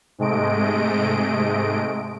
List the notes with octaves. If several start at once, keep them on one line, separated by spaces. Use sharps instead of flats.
G#2 C3 G#3 A3 D#5 D7